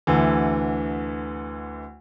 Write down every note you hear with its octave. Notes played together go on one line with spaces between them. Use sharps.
D2 D3 E3